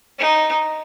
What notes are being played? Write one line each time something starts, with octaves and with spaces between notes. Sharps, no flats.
D#4